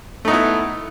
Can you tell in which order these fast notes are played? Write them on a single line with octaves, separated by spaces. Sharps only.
A3 D#4 B3 E4